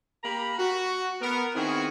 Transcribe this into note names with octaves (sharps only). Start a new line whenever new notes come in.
A#3 G4 A#5 B5
F#4
B3 A#4
D#3 B3 C4 E4 F#4 G#4